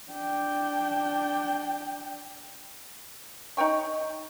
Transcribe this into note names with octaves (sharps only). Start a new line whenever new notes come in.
D4 G5
D#4 C#5 G5 C#6